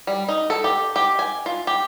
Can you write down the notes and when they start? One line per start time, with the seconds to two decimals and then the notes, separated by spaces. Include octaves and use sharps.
0.07 G3
0.29 D#4
0.50 A4
0.64 G4
0.96 G4
1.19 G#5
1.46 F4
1.67 G4